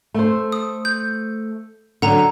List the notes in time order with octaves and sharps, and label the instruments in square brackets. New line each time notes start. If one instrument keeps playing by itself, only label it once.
[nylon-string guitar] A3 C5
[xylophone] D#6
G6
[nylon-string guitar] D3 F#3 [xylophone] F#5 A#5